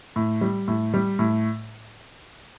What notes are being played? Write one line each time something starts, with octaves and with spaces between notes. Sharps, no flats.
A2
G3
A2
G3
A2